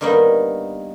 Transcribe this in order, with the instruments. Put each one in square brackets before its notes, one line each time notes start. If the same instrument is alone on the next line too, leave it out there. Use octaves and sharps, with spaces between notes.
[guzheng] G2 D#3 A#3 B3 D#4